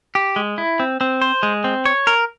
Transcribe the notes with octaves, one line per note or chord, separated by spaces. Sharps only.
G4
G#3
E4
C4
C4
C5
G#3
C4
C#5
A#4